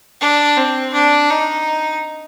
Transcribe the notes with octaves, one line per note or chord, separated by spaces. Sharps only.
D4
C4
D4
D#4